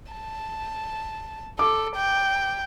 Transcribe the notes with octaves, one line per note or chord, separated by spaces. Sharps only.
A5
A4 D6
G5